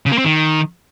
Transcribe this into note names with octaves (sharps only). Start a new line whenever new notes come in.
C#3
A#3
C4
D#3